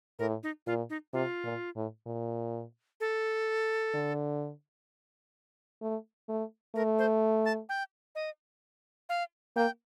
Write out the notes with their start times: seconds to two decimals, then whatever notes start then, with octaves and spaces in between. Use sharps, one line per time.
0.19 A2 A#4
0.43 D#4
0.66 A#2 F4
0.90 D#4
1.13 C3 F4
1.44 A#2
1.76 A2
2.07 A#2
3.00 A4
3.94 D3
5.82 A3
6.29 A3
6.75 A3 A#4
6.99 C5
7.45 A5
7.69 G5
8.15 D#5
9.09 F5
9.56 A#3 G5